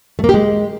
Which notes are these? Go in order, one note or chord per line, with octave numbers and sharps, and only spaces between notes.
A3
A#3
G4
G#3